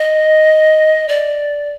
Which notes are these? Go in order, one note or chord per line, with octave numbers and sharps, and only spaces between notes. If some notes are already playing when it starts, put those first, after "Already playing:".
Already playing: D#5
D5